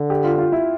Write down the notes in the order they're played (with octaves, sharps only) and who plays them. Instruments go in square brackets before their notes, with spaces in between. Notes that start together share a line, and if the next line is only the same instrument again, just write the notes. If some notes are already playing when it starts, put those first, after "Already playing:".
Already playing: [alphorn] D3
[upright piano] G4
F4
F4
E4